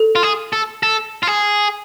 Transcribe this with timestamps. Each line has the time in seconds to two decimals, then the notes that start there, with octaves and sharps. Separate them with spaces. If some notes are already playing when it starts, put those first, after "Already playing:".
Already playing: A4
0.15 F4
0.23 G#4
0.53 A4
0.83 A4
1.23 F4
1.27 G#4